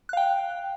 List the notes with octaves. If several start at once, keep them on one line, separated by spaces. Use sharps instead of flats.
F5 G5 F#6